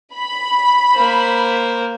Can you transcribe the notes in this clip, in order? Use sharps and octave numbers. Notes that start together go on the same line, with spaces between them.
B5
A#3 C5